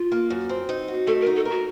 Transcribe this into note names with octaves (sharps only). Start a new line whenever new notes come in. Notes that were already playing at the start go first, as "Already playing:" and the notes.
Already playing: F4
A#3
F#2
C4
D#4
F#4
A3 A4
A#4
D#4
A4
A#4
F#4